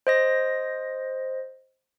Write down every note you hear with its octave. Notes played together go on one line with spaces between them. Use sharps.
C5 D#5 A#6